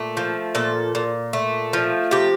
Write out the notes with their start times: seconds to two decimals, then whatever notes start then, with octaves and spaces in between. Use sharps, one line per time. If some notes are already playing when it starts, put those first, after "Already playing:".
Already playing: A#2 A3
0.17 F3
0.55 A#2 A4
0.95 A#2
1.33 A3
1.73 F3
2.11 C3 G4